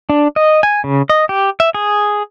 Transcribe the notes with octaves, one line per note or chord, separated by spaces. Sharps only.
D4
D#5
G#5
C#3
D#5
G4
E5
G#4